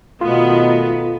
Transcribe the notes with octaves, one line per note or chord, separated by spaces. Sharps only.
B2 D#3 A3 B3 F4